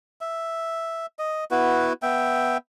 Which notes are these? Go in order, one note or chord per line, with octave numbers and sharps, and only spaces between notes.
E5
D#5
B3 E4 F#4 B4
B3 E5 G5